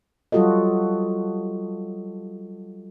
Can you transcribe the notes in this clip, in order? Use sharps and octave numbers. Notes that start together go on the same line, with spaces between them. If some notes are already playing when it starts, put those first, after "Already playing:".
F#3 G3 F4 F#4 A4 D#5